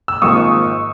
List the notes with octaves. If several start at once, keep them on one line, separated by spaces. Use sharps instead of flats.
E6
G#1 G#2 F3 A#3 C#6 D#6